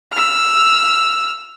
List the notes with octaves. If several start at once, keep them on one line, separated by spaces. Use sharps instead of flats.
E6 F6